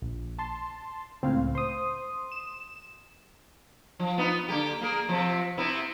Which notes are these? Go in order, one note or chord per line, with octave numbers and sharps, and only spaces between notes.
A#1
A5 C6
C#2 A2 C4 F5
C5 C6 D#6
E7
F3
B3 D#4 F4
D3 A#3 G4
A#3 G#4 A#4
C3 F3
C3 B3 E4